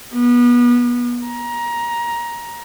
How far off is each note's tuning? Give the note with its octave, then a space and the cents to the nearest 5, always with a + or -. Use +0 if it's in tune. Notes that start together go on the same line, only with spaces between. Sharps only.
B3 -25
A#5 +20